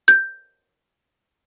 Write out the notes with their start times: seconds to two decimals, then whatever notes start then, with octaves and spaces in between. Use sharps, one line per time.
0.08 G6